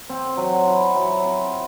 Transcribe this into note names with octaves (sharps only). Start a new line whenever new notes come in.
C4
F#3
E4
F#3
C4